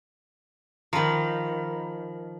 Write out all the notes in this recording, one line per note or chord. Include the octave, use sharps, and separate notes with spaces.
D#3 F3 A#5 B5